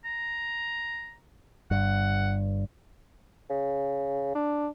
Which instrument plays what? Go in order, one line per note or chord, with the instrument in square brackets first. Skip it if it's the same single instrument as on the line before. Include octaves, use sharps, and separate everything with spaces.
[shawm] A#5
[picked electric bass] G1 G2 [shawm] F#5
[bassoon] C#3
D4